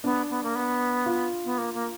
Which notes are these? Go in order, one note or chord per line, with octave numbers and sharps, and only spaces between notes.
B3 D4
B3
A#3
B3
F4
B3
A#3
A#3